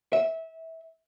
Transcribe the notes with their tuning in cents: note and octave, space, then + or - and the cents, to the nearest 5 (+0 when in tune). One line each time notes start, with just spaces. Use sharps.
E5 -20